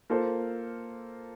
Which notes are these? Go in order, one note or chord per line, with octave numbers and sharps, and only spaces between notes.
A#3 F4 A4 C5